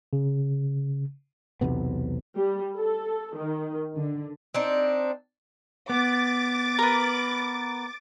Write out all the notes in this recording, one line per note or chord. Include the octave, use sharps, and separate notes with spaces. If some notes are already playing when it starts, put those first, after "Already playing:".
C#3
B1 E2 C3 B3
G3
A4
D#3
D3
C4 D4 D#4
B3 D6 A6
A#4 B4